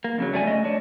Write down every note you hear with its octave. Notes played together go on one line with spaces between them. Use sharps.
A#3
F2 C#3 F#3
G2 A3 D5 G#5
A3 D#5
D4 C#5